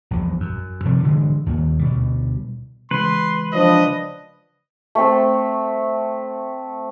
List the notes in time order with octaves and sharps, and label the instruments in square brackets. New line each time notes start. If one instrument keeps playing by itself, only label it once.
[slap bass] A#1 E2
F#2
C3 F3 G3
A#2 D3 E3 G#3
D#2 A#2 D#3
D2 B2 G3
[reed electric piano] C#3 E3 G#3 [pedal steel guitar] B4 [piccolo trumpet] C6
[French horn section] F3 D4 [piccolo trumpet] D#5
[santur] A3 C4